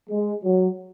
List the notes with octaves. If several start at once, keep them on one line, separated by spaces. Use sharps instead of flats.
G#3
F#3